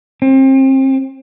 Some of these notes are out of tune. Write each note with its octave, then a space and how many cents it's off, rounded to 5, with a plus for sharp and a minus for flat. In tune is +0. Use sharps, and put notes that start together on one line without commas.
C4 +30